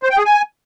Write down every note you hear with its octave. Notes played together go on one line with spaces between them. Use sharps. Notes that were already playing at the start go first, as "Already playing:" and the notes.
C5
G5
G#4
G#5